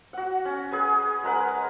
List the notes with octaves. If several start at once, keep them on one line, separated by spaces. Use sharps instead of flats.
F#4 F#5
C#4
G#4 B4 G#5
G#3 A#4 B4 F#5